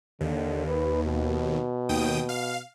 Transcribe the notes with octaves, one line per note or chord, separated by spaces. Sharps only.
D#2 D3
B4
B2
D#2 G5 D#6
F5